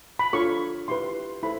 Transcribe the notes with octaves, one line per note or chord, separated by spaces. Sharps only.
B5
D4 F4 A4 C#5 C#6
E4 G4 B4 C6
E4 A4 C5 B5